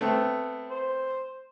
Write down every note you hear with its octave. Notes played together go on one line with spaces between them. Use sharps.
A3 B3 C4
C5